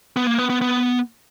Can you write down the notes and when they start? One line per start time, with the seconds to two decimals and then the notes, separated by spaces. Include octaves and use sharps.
0.16 B3
0.27 A#3
0.38 B3
0.50 B3
0.61 B3